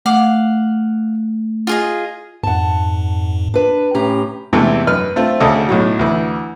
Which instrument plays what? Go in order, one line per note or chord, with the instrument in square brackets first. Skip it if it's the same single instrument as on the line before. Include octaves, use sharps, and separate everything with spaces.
[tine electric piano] A3 [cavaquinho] F5 F#5 D6
[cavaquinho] F4 G#4 D#5
[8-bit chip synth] F2 G#2 [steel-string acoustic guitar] F#5 A5
[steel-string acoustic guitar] D4 B4
[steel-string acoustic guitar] A2 G4 A#5 [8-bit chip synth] C#4
[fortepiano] E2 G#2 C3 E3 A3
F#2 B4 F6
A3 C4 F4
D2 C#3 A4 D#5
B1 A2 F#3
D2 E3